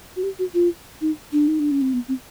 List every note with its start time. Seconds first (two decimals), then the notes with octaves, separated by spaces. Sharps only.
0.16 F#4
0.23 G4
0.39 F#4
0.54 F4
1.01 D#4
1.32 D4
1.48 D#4
1.59 D4
1.71 C#4
1.81 C4
1.93 B3
2.08 C4